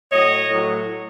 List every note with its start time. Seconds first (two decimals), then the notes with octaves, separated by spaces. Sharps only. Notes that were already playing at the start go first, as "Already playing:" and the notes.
0.11 A2 F#3 C#5 D#5
0.49 A2 F#3